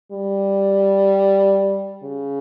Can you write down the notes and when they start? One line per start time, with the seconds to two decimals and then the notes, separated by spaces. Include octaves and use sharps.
0.12 G3
2.04 C#3